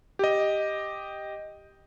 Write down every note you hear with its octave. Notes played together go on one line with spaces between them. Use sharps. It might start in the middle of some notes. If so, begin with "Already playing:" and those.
G4 D#5